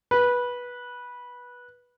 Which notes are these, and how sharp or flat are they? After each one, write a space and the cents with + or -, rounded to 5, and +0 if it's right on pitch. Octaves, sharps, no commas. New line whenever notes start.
B4 -15